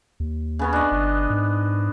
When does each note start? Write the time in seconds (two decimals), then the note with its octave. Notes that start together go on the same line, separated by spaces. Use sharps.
0.20 D#2
0.59 C#3 B3 C#4
0.73 D4 D#5
0.92 G1
1.30 G#2